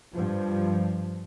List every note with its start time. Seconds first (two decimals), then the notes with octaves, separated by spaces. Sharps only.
0.14 G2 F3